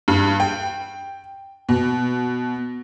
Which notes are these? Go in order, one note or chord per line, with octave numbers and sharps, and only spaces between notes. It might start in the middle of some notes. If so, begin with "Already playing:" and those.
G2
G5
B2